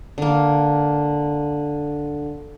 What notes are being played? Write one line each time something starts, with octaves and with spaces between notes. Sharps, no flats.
D3 A#3